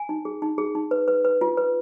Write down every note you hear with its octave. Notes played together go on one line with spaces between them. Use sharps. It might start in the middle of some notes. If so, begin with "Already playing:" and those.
Already playing: G#5
D#4
G#4
D#4
G#4
D#4
B4
B4
B4
F4
B4